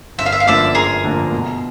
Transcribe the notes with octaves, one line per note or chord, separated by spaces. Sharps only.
G1 E5
F5
E5
F5
F#2 D3 F3 A#3 D5 E5
G1 G#4 A#4
F#2 D3 F3 A#3
B2